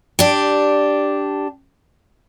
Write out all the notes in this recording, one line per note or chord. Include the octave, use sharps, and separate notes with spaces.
D4 G4